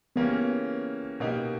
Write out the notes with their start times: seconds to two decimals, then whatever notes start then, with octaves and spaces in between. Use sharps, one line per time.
0.16 C#3 E3 A#3 B3 C#4 G4
1.20 B2 A#3 D#4 G4